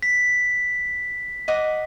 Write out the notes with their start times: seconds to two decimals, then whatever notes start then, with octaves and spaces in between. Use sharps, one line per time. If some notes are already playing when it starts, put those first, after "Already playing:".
0.03 B6
1.48 D#5 F#5 D6